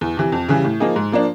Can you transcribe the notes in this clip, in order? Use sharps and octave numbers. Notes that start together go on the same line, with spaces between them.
E2
C3 E3
F2
C#3 E3 G3
A2
F3 A#3 D#4 G#4
G#2
F3 A#3 D4